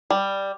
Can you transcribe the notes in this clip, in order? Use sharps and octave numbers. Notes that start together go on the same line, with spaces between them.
G3